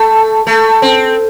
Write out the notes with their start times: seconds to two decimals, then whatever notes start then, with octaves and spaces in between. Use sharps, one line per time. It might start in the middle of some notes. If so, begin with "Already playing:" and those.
Already playing: A3 A4
0.47 A3 A4
0.82 C4